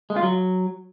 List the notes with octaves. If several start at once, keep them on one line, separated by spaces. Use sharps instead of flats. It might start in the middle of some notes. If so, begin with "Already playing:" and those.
G#3
F4
F#3